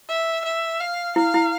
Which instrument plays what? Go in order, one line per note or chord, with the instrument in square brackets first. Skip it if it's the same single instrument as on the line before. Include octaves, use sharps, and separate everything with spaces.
[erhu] E5
E5
F5
[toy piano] E4 [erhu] F5
[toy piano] E4